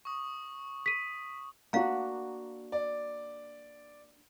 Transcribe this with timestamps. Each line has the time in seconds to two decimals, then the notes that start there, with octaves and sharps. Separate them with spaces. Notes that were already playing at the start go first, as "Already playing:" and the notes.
0.05 C#6 D#6
0.86 B6 D#7
1.73 A#3 D4 F#4 F5 A#5
2.72 D5